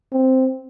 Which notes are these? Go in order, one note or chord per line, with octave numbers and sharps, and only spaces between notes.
C4